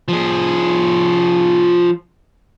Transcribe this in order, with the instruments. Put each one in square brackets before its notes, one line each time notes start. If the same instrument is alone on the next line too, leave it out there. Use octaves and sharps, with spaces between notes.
[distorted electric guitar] F3 G#4